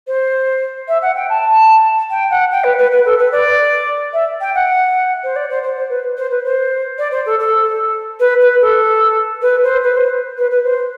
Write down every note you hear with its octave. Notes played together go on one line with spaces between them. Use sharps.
C5
E5
F#5
G5
A5
G5
F#5
G5
B4
B4
B4
A4
B4
D5
E5
G5
F#5
C5
D5
C5
C5
C5
B4
C5
B4
C5
D5
C5
A4
A4
B4
B4
A4
B4
C5
B4
C5
B4
B4
C5